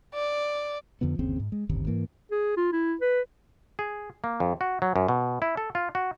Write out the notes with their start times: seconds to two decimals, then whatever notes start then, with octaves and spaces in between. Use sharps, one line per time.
0.14 D5
1.01 F2 D3 F3 B3
1.19 G1 D#2 C#3 C4
1.40 G#2
1.52 G#3
1.69 D1 G1 C3 D#3
1.87 G#2 E3 A#3
2.31 G#4
2.57 F4
2.73 E4
3.01 B4
3.79 G#4
4.24 A#3
4.40 F2
4.61 F#4
4.82 F#3
4.96 F#2
5.08 B2
5.42 E4
5.57 A4
5.75 F4
5.95 F#4